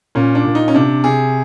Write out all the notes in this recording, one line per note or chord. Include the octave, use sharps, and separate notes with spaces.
A#2 C#4
D4
A#2
D#4
C#4
C3 D4
C3 G#4